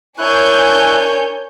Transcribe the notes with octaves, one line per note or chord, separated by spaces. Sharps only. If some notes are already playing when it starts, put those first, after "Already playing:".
D4 E4 A#4 C#5 G#5 F#6 G6